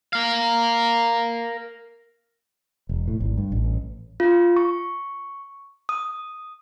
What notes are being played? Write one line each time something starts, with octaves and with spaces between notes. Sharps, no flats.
A#4 F5
E1
A2
G#1
G2
A1
F4
C#6
D#6